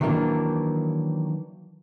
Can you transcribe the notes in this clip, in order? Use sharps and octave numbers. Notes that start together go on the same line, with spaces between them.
D#3 E3 F#3 A#3 D4